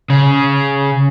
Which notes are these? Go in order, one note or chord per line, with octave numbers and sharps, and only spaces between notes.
C#3